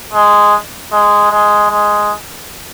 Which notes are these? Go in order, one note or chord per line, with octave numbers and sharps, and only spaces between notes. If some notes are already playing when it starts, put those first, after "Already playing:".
G#3
G#3
G#3
G#3